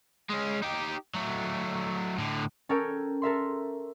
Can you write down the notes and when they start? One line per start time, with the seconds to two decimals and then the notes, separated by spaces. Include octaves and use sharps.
0.29 G#3 C#4
0.62 D#4 G4
1.14 F#3 A3
2.18 A2 D3
2.69 C#4 A4 A#4 C#5 G5
3.22 A4 A#4 E5 C6